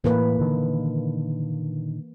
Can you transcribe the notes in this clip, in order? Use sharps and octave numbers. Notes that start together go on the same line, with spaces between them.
A2 E3 A#3 B4
A#2 D3 D#3